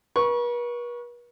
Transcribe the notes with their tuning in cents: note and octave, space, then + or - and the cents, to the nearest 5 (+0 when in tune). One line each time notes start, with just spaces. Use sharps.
B4 -45 C#6 +0